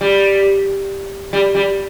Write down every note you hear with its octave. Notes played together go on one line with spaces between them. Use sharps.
G3
G3
G3